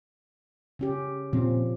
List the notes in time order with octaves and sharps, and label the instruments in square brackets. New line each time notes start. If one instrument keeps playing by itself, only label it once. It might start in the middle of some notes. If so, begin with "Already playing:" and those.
[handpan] C#3 C#4 G4
[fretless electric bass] A#2 C4 [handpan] F3